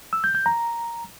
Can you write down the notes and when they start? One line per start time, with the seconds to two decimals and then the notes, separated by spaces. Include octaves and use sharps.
0.13 E6
0.24 G6
0.35 G6
0.46 A#5